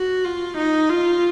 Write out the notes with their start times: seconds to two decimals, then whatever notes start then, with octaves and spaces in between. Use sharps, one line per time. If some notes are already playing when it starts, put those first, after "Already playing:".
Already playing: F#4
0.25 F4
0.58 D#4
0.89 F4